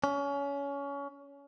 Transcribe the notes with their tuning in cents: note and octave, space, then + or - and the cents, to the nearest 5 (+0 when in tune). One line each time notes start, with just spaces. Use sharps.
C#4 +25